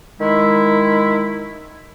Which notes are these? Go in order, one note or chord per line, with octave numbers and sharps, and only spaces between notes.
D#3 G#3 E4